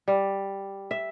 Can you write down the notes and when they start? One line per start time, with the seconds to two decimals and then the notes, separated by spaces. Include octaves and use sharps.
0.08 G3
0.91 E5